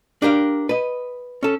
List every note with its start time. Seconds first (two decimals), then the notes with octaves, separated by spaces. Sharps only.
0.22 D4 G4 A#4 F5
0.69 B4 D#5
1.43 C#4 A4